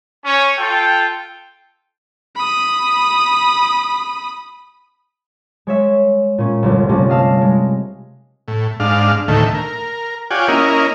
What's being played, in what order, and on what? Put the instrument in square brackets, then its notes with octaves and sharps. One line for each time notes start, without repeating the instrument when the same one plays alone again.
[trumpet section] C#4 C#5
F4 A4 G5
[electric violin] B5 D#6
[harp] G#3 C#5 E5
A#2 C#4
G1 C2
C3 G3 A3 A#3 C#4
D#5 F5 A5 E6
G#3
[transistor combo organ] A2
G#2 D4 F5
D2 A2 D#3 A3
A#4
F4 G4 C#5 D5 F#5 G#5
A#3 C#4 E4 A#4 D#5